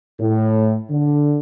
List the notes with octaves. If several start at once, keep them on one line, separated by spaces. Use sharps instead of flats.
A2
D3